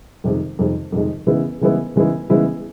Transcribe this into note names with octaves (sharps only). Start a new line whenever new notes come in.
F2 C3 D#3 G#3
F2 C3 D#3 G#3
F2 C3 D#3 G#3
C#3 E3 G#3 B3 E4
C#3 E3 G#3 B3 E4
C#3 E3 G#3 B3 E4
C#3 E3 G#3 B3 E4